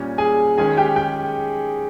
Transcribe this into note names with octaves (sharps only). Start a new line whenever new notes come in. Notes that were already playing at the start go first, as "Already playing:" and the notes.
Already playing: A#2 G3 C#4
G#4 G#5
D#3 G#3 C#4 G#4 G#5
G4 G5
G4 G5